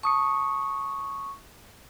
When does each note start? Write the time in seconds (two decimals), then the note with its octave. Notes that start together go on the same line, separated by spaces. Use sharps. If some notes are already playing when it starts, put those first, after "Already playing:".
0.03 A5 C#6 D#6 C#7